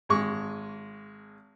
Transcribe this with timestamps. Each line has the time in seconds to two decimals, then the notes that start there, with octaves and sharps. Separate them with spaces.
0.09 G#1 G#3 C#6